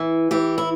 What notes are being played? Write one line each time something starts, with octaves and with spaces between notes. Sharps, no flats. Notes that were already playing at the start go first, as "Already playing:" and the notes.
Already playing: E3
E3 G4
E4